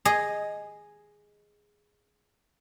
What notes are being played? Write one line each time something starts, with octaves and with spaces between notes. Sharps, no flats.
G#4 D#5